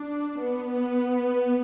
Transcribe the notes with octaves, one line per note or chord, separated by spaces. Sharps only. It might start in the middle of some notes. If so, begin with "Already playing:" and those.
Already playing: D4
B3